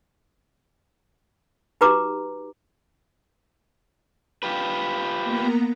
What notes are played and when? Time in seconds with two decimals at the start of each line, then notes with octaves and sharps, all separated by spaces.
1.81 D#4 F#4 G4 B4 A#5 D6
4.43 F4 G4 B4
5.24 A#3 B3 A#5